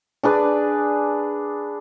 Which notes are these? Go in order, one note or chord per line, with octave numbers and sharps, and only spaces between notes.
D4 G#4 B4 D5